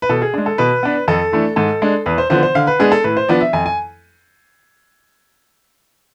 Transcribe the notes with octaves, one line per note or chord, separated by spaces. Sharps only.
B4
B2 A4
G#4
G#3 D4
A4
B2 B4
B3 D4
F2 A4
E3 A3 D4
G#2 A4
G#3 D4
E2 B4
C5
D3 F3 B3 D4 C5
C5
D3 F5
B4
G#3 B3 D4 G#4
A4
A2 B4
C5
F3 B3 D4 D5
E5
F2 G#5
G#5